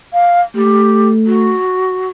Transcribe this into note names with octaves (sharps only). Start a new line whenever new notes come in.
F5
A3 G4
F#4